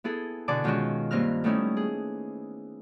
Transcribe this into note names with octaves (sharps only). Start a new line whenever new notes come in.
B3 E4 G#4 A4
B2 D3 D5 G#5 A5 D6
B2 D#3 G#3 C#4 F4 F#4
G2 A#3 C4 A#4 F6
G3 A3 B3 C#4 D#4 E4
G#4